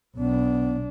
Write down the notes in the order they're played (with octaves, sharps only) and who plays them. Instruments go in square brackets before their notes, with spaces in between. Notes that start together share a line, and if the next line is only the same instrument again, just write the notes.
[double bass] B1 D4 [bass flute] B3